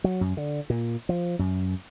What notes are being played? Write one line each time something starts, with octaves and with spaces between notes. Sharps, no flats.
F#3
F#2
D3
A#2
F3
F#2